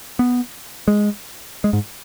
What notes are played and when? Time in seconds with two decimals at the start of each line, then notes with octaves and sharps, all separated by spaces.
0.19 B3
0.88 G#3
1.64 G#3
1.73 G#2